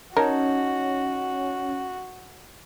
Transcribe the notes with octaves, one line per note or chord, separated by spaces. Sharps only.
C#4 D#4 F#4 A#4 C#5 A5